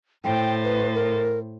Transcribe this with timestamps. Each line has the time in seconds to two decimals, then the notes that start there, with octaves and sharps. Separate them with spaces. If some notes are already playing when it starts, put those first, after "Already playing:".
0.24 A2 C5 G5 A6
0.64 B4
0.94 A#4